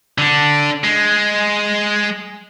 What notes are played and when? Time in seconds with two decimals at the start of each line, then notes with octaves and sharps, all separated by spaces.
0.18 D3 D4
0.84 G#3